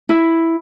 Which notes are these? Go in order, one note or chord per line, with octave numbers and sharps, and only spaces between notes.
E4